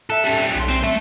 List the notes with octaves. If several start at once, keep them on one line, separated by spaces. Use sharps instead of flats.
A4 E5 F#6
G3 C#4
B1 C6
C4
A3 E5